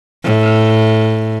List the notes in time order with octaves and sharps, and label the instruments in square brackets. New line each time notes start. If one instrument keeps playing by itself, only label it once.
[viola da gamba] A2